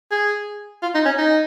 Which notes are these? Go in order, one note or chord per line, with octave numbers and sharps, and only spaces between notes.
G#4
F4
D#4
C#4
D#4